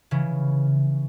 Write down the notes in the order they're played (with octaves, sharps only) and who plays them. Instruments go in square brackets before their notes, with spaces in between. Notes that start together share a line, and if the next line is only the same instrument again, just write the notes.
[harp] C#3 E3